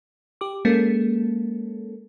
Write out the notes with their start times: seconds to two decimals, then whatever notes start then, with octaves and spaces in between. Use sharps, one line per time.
0.41 G4 D6
0.65 G#3 A#3 C#4 A4